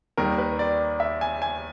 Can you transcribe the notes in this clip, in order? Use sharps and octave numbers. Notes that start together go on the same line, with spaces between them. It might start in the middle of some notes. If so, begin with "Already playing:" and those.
D#2 D#3 G3 A#4
B4
D5
E5
G#5
G#5